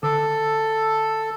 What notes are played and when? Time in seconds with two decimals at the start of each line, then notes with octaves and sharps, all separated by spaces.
0.03 D3 A4